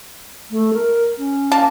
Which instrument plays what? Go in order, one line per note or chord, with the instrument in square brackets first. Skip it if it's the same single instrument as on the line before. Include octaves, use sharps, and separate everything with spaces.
[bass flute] A3
A#4
C#4
[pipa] A#3 A5